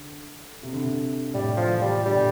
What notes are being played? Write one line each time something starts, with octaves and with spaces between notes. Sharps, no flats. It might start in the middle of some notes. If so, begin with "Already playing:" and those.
Already playing: D3
C3
D3
C3
A2 G3
F3
E3
G3
D3 G3
A#2